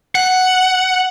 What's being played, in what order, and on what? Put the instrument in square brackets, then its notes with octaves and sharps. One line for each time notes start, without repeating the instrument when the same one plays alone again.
[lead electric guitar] F#5